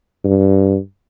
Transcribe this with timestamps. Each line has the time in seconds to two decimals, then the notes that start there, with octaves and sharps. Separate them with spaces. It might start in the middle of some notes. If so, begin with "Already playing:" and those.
0.25 G2